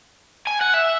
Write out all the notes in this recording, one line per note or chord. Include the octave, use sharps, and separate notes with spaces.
G#5
F#5
E5